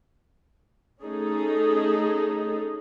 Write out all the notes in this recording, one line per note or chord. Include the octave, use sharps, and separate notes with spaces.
A3 C#4 D#4 G#4 A4